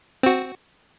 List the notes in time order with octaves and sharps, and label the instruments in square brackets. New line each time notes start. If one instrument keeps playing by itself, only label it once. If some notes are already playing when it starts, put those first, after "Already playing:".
[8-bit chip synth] C4 F#4